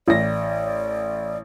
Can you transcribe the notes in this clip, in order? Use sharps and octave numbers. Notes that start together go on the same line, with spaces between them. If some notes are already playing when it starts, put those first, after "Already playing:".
A1 D5 A#6